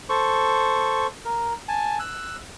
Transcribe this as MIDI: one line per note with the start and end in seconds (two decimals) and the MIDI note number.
0.09 1.07 69
0.09 1.07 72
0.09 1.07 85
1.25 1.54 70
1.68 1.98 80
1.68 1.98 81
1.99 2.37 88
1.99 2.37 90